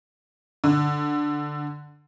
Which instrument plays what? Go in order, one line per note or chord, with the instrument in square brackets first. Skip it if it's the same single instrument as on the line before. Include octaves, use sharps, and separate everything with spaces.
[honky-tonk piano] D3